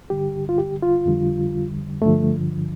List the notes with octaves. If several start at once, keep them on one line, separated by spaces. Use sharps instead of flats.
G2 D3 G3 G4
F4
G4
F4
F2 D3 G3
G2 D3 F3 A3